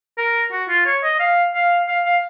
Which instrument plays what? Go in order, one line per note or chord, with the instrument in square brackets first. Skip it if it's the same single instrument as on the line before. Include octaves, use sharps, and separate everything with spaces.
[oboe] A#4
F#4
F4
C#5
D#5
F5
F5
F5
F5